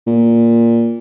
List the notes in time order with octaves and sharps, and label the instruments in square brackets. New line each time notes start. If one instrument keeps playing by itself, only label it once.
[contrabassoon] A#2